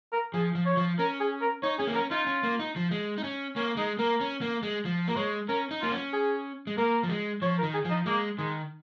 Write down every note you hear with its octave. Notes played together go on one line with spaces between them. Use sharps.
A#4
F3 G#4
F3
C#5
F3
C#4 A#4
G#4
A#4
D#4 C#5
C#4 G#4
A#3
C#4 A#4
D#4 F4
C#4
A#3
D#4
F3
G#3
D#4
C#4
A#3 C#4
G#3 D#4
A#3 A#4
C#4
A#3
G#3
F3
A#3 A#4
G#3 C#5
C#4 A#4
D#4
A#3 F4
C#4
G#4
G#3
A#3 A#4
F3
G#3
F3 C#5
A#4
D#3
G#4
F3
D#4
G#3 A#3
D#3 G#3